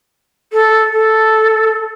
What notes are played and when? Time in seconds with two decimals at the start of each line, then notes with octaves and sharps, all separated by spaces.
0.53 A4
0.94 A4